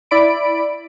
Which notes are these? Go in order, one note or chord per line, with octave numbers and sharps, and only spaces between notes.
E4 D5 B5 D7